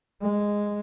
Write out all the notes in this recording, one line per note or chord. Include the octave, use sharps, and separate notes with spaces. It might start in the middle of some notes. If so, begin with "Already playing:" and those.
G#3